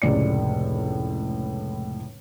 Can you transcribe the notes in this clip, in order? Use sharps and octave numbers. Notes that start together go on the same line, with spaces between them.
F1 C#2 A2 D5 C#7